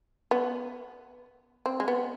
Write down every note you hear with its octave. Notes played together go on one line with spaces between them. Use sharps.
B3
C4
G#3
B3